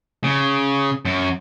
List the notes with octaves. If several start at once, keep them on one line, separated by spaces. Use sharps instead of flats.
C#3
F#2